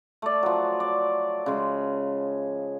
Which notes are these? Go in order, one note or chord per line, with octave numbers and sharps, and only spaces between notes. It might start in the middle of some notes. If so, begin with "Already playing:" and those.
A3 D5
F3 F#3
D5
C#3 G#3